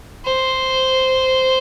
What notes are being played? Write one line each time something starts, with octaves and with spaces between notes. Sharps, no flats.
C5